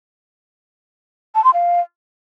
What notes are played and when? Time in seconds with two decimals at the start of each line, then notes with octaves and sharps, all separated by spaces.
1.35 A5
1.44 C6
1.53 F5